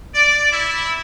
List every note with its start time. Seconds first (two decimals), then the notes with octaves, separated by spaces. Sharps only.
0.14 D5
0.51 E4